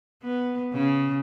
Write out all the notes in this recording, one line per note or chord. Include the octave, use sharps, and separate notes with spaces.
B3
C#3